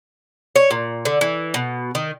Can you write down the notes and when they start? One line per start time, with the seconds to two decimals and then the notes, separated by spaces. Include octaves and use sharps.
0.56 C#5
0.71 A#2
1.05 D3
1.21 E3
1.54 B2
1.95 D#3